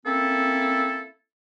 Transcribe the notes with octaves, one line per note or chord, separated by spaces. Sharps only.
A#3 C4 C#4 E4 A4